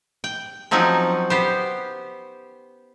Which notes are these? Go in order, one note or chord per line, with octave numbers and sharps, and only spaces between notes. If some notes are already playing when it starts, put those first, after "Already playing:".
G5
F3 F#3 C4 C#4 D#4
B3 G4 C5